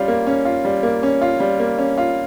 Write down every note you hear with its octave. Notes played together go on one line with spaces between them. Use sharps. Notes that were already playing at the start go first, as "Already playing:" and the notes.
Already playing: G3 C#4 F4
A#3
C#4
F4
G3
A#3
C#4
F4
G3
A#3
C#4
F4